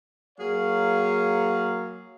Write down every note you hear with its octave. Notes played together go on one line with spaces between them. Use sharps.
F#3 A#3 G#4 C#5 F5